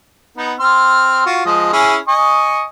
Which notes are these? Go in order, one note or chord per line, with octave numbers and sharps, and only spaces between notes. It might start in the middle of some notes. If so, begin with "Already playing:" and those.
B3 D#4
C4 C6 F6
F4 F#4
F3 G#3 D#5
C#4 E4 G#4
D#5 G#5 C#6